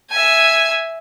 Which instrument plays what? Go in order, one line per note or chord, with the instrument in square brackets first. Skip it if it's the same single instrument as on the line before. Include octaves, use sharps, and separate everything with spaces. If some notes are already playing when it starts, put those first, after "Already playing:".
[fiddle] E5 G#5